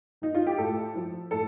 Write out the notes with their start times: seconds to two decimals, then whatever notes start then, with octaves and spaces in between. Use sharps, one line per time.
0.22 D#3 D#4
0.35 F4
0.47 G4
0.58 A2 A4
0.95 F3
1.31 A2 A4